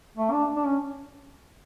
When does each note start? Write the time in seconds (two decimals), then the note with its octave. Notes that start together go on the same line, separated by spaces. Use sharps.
0.17 A3
0.32 D4
0.56 D4
0.66 C#4